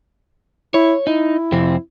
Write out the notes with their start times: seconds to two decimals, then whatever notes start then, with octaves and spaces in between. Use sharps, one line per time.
0.74 E4 C#5
1.07 D#4 E4
1.52 F2 C3 C4